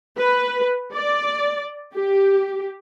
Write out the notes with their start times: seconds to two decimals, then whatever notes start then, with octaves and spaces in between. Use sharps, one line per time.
0.17 B4
0.94 D5
1.95 G4